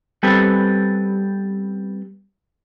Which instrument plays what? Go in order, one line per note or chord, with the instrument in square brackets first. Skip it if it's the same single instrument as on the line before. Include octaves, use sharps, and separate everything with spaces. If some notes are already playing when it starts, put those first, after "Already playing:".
[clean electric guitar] G3 B3 C4 A4 B4